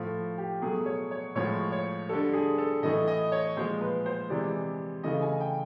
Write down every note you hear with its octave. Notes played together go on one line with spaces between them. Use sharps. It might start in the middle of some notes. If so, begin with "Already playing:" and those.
Already playing: A2 F3 A3
G4
B2 F#3 A3 G#4
C#5
C#5
A2 F3 G#3 C#5
C#5
D3 G3 A4
G#4
A4
A2 E3 A3 D#5
D#5
C#5
A#2 F3 G#3 C5
B4
C5
C3 E3 G#3 D5
C#3 E3 A3 D#5
G#5
G5